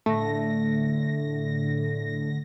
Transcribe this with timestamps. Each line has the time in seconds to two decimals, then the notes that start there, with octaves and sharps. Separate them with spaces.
0.06 A2 D3 A3 A#6